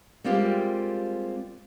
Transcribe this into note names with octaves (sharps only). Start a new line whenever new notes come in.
G3 G#3 A#3 C4 F4 G4